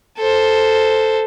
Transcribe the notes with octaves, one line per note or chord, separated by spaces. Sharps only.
A4 C5